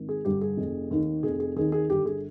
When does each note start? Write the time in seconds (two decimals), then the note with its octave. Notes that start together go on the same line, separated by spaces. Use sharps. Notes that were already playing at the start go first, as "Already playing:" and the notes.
Already playing: G#1
0.09 G#4
0.25 G2 D3 G4
0.41 G#4
0.57 F1
0.91 D#2 D#3
1.23 F1 G#4
1.40 G#4
1.56 D#2 D#3 G#4
1.72 G#4
1.90 G1 G4
2.06 G#4